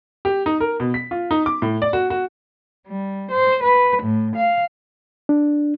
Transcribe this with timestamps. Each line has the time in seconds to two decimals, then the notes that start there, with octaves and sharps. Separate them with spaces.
0.25 G4
0.46 D#4
0.60 A#4
0.80 B2
0.94 B6
1.11 F4
1.31 D#4
1.46 D6
1.62 A2
1.82 D5
1.93 F#4
2.10 F#4
2.88 G3
3.31 C5
3.63 B4
4.04 A2
4.36 F5
5.29 D4